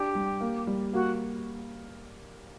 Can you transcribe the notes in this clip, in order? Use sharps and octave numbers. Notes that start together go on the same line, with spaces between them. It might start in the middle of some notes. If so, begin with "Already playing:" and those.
Already playing: D4 G4
G3
A#3
G3
A#3 F#4